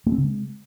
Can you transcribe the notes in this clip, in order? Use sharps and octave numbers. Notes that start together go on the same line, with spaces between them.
A3
C4
C#3
G#3